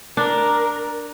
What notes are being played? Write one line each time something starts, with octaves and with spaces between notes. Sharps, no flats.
D4 A#4